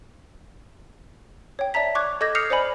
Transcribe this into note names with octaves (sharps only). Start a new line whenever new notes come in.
C#5 G5
D5 E5 A5 A#5 B6
C#6 D6 F#6 G#6
A4 D#5 D6 G6 G#6 A#6
D#6 F6 G6 C7 C#7 F7
C5 D5 D#5 G#5 B5